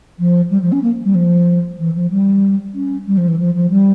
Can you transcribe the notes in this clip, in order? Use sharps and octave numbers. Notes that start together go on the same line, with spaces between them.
F3
G3
F3
C#4
A#3
G3
F3
E3
F3
G3
C#4
G3
F3
E3
F3
F3
G3